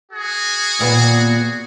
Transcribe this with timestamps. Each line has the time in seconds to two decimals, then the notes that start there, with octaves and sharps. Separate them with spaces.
0.11 F#4 G#4
0.79 D#2 A#2 B3